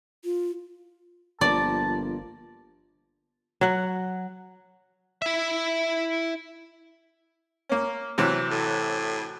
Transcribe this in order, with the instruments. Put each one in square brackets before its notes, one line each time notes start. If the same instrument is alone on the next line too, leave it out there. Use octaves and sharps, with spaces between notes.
[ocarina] F4
[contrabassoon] G1 [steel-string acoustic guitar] F3 A#3 [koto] D5 [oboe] A5
[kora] F#3 F#5
[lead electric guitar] E4 E5
[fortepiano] A#3 C#4
C3 E3 F#3
[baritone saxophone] A2